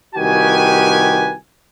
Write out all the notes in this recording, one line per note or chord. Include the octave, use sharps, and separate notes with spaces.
C2 D#3 F#4 G4 B4 G#5